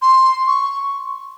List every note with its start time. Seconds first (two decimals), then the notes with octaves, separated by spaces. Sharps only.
0.02 C6
0.47 C#6